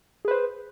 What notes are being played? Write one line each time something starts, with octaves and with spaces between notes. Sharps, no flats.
G#4 B4 C5